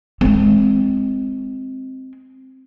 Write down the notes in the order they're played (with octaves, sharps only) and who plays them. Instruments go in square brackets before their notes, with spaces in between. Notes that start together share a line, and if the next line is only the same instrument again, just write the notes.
[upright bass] G#3 C4